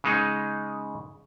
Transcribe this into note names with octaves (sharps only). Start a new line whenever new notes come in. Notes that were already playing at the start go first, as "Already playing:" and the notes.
C#3 G#3 D#4